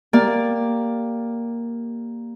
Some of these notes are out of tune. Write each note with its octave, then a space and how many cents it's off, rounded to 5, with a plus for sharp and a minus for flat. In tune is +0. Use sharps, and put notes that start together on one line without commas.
A#3 +0 G4 +5 D5 +0